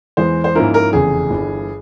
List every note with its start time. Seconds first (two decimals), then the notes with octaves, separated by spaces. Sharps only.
0.17 E2 E3 G#3 C5
0.44 C5
0.55 G#2 F3 A#3 C#4 E4 A#4
0.74 A#4
0.93 F1 E2 C#3 G#4
1.30 G1 G2 E3